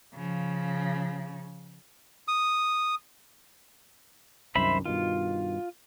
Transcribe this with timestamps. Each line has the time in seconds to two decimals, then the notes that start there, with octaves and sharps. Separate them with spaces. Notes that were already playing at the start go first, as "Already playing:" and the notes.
0.14 C#3 F3
2.28 D#6
4.55 C2 F#2 D#3 C5 E5 B5
4.85 G2 B2 D#3 F4